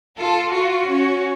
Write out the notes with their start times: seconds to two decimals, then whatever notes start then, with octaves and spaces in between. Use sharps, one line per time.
0.18 F4 A4
0.53 F4 F#4
0.88 C#4